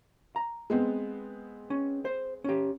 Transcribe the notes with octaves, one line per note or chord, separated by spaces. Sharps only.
A#5
G#3 B3 C4
C#4
C5
C#4 G4